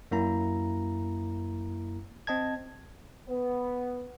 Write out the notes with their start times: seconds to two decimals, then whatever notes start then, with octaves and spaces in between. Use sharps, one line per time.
0.11 F#2 A#3 E4 A#5
2.27 C4 D#5 A5 G#6
3.29 B3